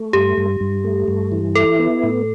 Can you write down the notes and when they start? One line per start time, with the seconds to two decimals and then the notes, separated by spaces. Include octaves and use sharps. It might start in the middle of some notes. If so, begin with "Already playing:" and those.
Already playing: A3
0.13 G2 G4
0.37 G2
0.61 G2
0.84 A3
1.08 G2
1.32 E3
1.55 E4 A4
1.79 B3
2.03 A2